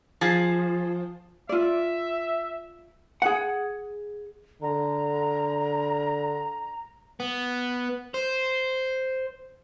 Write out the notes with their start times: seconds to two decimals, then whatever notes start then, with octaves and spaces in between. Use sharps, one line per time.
0.21 F3 G#4 A5
1.49 F4 D5 E5
3.22 G#4 F#5
4.62 D3 A#5
7.20 B3
8.14 C5